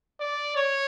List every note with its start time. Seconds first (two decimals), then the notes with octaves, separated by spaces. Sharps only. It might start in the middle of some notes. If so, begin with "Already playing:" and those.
0.20 D5
0.56 C#5